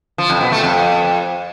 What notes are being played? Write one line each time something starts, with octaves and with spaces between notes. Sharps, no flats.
F3
F2
B2
A3
F2